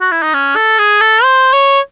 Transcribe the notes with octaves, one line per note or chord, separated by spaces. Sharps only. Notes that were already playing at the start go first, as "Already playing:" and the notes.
F#4
E4
D#4
C#4
A4
G#4
A4
C5
C#5